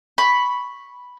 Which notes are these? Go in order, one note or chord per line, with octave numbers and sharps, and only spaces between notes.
B5 C#6